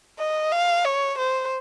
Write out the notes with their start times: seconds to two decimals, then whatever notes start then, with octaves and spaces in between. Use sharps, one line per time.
0.19 D#5
0.52 F5
0.85 C#5
1.19 C5